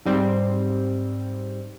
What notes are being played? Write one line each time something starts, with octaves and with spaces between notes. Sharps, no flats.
G#2 G3 C4